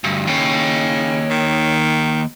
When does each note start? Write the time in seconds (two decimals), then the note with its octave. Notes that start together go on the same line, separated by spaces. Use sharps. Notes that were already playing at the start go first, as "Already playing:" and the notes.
0.04 D2 G2
0.27 D#2 C#3 C#5 G5
1.30 D#3